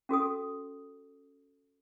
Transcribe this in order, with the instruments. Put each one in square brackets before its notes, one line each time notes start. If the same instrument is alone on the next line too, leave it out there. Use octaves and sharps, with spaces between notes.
[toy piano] C#4 F#4 A4 D#6